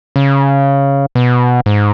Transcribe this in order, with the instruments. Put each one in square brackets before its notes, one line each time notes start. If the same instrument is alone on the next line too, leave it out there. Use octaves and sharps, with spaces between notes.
[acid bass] C#3
B2
G#2